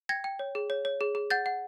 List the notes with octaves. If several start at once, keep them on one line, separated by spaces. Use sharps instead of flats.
G5 G#6 A#6
G5
C#5
G#4
C#5
C#5
G#4
G#4
F#5 G6 A6
F#5